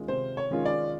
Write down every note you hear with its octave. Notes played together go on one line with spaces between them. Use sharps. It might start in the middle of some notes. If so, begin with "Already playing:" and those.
Already playing: D#3 G#3 C#4 F4
C3 C5
C#5
D#3 G#3 C#4 F4
D5